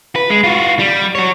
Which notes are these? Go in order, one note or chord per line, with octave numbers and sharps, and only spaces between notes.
B4
G#3
F4 F#4
G3
F#4 C#5